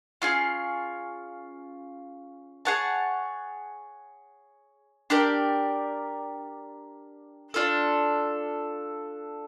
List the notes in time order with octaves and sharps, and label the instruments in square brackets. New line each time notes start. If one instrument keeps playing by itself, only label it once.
[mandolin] C#4 F4 G#4
G#4 C#5 F#5 A5
D4 G4 A#4 D5
D4 F4 A4